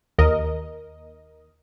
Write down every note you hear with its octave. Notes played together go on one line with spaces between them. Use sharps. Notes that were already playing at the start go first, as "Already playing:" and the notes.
D#2 A#4 D#5